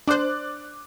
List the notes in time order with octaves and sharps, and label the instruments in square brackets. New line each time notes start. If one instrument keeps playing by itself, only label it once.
[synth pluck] D4 C5 [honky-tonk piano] D5 D6 F#6